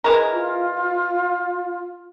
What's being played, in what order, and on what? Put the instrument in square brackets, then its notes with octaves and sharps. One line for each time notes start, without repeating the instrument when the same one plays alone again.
[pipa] E3 G#3 A#4
[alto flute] F4